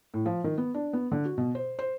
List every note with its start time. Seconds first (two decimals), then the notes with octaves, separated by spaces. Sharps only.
0.14 A2
0.26 F3
0.44 D#3
0.58 B3
0.75 D4
0.93 B3
1.12 D3
1.25 F#4
1.38 B2
1.55 C5
1.79 C5